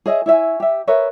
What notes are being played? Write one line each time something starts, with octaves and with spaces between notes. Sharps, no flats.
G#4 C#5 D#5 E5
E4 C#5 E5 G#5
G4 E5
A#4 B4 C#5 E5